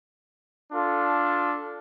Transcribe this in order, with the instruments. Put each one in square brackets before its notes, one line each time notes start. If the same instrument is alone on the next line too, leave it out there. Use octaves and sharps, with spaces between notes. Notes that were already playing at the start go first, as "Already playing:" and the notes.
[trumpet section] D4 F4 A4